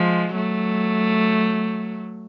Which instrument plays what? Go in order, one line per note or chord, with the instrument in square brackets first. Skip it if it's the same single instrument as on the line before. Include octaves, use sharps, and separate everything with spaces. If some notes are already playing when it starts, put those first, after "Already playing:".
Already playing: [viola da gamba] F3 G#3
F#3 A3